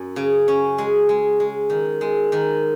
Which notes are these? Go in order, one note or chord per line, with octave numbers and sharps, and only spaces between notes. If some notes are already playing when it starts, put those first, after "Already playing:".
Already playing: F#2 C#4
C#3
C#4
G#3
G#3
G#3
D#3
G#3
D#3